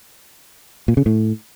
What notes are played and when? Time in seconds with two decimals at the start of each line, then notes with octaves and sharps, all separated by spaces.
0.88 A#2
0.97 C#3
1.06 A2